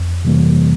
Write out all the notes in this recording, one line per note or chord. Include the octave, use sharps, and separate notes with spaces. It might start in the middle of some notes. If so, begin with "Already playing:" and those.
Already playing: F2
C3 E3 G3 A#3